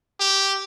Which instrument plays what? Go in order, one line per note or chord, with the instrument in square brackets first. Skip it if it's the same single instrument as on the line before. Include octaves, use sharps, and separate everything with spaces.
[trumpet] G4